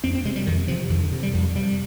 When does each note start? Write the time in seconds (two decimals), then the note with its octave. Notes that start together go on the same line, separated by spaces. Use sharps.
0.03 F2 C4
0.15 C4
0.25 C3 G#3
0.36 G3
0.46 F2 D#3
0.68 C3 F3
0.90 F2 D#3
1.01 D3
1.12 C3
1.23 G3
1.34 F2 G3
1.55 C3 G3